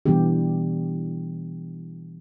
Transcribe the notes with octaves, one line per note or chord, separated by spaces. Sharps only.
B2 E3 G3 B3 D4 G4